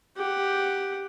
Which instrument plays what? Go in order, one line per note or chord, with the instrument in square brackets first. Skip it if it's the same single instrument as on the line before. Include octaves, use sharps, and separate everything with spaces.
[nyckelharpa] G4 F#5